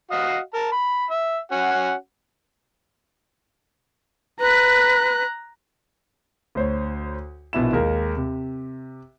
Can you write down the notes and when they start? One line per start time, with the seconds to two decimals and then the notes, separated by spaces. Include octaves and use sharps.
0.11 F#4 D#5 F5
0.54 A#4 A5
0.72 B5
1.10 E5
1.52 C#4 F#4 F#5
4.40 B4 A#5 F#6
6.55 D2 C5 C#5
7.53 A#1 B2 E4 E7
7.73 D#2 G#3 A#4 F5
8.17 C3